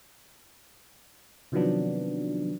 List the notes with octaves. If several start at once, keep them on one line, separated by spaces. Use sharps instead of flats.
C3 D#3 F3 F#3 B3 D4